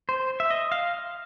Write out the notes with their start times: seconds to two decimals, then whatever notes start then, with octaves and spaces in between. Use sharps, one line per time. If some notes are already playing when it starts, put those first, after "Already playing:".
0.09 C5
0.40 E5
0.50 D#5
0.72 F5